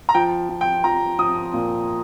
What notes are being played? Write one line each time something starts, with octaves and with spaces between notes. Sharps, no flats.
A#5
F3 G5
F3
G5
F3 A#5
F3 D#6
A#2